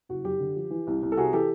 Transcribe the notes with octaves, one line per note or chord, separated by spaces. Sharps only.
F#1 F#4
F#2 G4
D3
F3
E3
C2
C2
A4
C3 F#4 G#4
E3 G4 A4